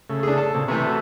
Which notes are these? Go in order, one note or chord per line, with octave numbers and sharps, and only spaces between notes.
C#3 A3
D4 G#4
A4
A#2 C#3 C4
C3 E3 A3 C#6
F#4 A4